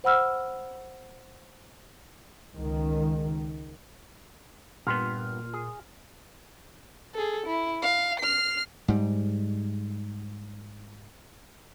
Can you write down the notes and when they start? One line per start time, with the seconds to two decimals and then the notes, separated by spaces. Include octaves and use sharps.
0.04 C5 F#5 B5 E6 F6
2.55 C#2 D#3
4.87 G2 A#2 B3 C6 F6
5.54 G#4
7.15 G#4 A4
7.46 E4
7.82 F5
8.20 F6 C7
8.88 G#2 G3